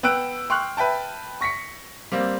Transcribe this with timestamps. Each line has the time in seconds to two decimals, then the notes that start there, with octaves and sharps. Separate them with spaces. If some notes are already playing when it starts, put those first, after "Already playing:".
0.03 B3 G5 E6 F#6 D7
0.50 G5 C6 C#6 F6 F#6
0.77 B4 E5 G5 A5
1.41 C#6 A#6 B6 C#7
2.12 G3 A#3 C4